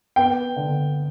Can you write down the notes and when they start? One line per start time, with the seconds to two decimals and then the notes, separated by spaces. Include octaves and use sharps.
0.16 B3 G5
0.56 D3